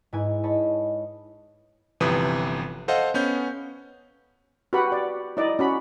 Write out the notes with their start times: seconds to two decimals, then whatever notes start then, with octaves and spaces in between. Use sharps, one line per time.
0.13 G#2 E4 B4 G#5
0.43 C#5 D#5 A5 B5
2.00 G1 C3 E3 F3 B4 D#6
2.88 A4 C5 D#5 F5 F#5
3.14 B3 C#4 G6
4.73 F#4 G4 B4 F#5 B5
4.92 D5
5.37 D#4 E4 D5 D#5
5.59 C#4 F#4 B5